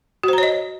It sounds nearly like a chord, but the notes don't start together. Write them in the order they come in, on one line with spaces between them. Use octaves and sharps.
F#4 C5 A#5 C#5 D#5